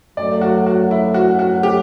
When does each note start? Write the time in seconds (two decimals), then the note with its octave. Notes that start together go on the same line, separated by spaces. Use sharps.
0.17 F#2 F#3 A3 D5
0.41 F#4
0.66 F#4
0.91 E4
1.14 F#4
1.39 F#4
1.63 G4